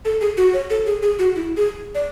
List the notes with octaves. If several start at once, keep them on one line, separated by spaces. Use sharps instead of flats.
A4
G#4
F#4
C#5
A4
G#4
G#4
F#4
E4
G#4
D5